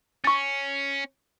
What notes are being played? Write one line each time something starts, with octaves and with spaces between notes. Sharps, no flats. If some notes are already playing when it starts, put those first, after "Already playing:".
C#4 C#6 A6